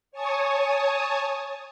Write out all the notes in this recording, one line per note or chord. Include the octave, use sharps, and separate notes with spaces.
C#5 G#5 A5 C#6 D#6